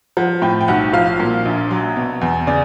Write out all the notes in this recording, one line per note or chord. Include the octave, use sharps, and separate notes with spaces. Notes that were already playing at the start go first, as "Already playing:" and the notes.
F3 F#5
A2 G5
G5
B1 F#5
F3 F5
A#2
A#1
F#3
B2
E2
C#3 D5